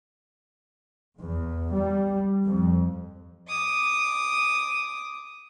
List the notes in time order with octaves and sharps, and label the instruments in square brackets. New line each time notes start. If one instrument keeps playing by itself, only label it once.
[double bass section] E2
G3
F2
[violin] D6 D#6